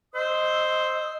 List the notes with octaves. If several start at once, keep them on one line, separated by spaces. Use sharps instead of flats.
C5 D#5 C6 D#6 E6